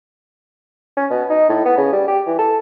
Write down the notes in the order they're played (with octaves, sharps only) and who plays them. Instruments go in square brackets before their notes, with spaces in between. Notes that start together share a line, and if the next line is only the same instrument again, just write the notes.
[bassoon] C#4
B2
D#4
A2
B3
C#3
G3
G4
E3
A4